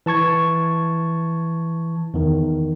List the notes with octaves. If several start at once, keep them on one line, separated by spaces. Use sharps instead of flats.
E3 A5 C#6 G#6
E2 D#3